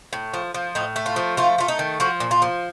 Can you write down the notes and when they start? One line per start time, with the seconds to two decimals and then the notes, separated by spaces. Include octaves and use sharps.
0.13 A2
0.34 F3
0.54 F3
0.75 A2 D#4
0.96 A3
1.06 F4
1.16 F3
1.37 A3 F4
1.58 A3 F4
1.68 D#4
1.79 D#3
2.00 F3 F#4
2.20 A#2
2.31 F4
2.42 F3